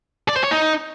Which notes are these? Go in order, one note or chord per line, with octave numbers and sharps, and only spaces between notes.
D5
C5
C#5
D#4